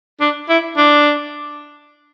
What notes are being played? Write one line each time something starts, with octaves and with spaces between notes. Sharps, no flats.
D4
E4
D4